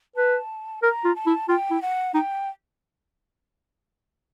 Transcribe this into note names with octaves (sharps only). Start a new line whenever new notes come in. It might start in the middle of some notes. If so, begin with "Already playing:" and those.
B4 A5
A#4 A#5
F4
A5
E4
F4 G5
E4
F#5
D#4 G5